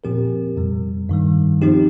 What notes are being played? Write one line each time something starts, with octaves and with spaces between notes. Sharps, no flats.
A#2 F3 C4 G4 A#4
F2 C3 G3
G2 D#3 G3
F3 C4 D#4 G4